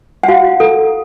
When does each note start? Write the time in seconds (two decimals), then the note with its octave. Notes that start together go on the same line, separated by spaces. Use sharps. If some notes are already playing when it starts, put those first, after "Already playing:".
0.23 F#5
0.28 F#4 F5
0.60 A4